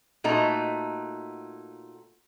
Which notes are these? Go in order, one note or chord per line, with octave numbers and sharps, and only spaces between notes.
A#2 A3 D#4 F#4